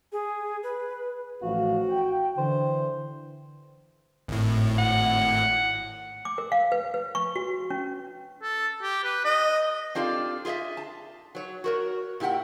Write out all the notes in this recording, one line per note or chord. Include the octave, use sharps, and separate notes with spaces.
G#4
B4
A1 F3 F#4 F5
G5
D3 E3 C5
G#1 A2
F#5
D6
A#4
F5
B4
B4
C#6
F#4
C#4
A4
G4
B4
D#5
C4 D4 F4 G4 A4
F4 G#4 C#5 D#5 E5
A5
F#3 C#5
F#4 A#4 C#5
A#2 E4 G4 F#5 G5